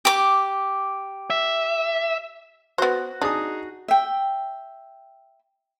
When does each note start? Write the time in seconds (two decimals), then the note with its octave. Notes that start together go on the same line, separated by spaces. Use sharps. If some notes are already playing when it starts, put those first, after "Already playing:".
0.05 G4 D6
1.30 E5
2.78 B3 F#4 C5
3.22 D4 D#4 G#4 D#6
3.88 E5 G5